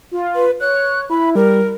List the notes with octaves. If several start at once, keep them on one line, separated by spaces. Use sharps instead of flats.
F4
B4
C#5 F#6
E4 B5
G3 A#4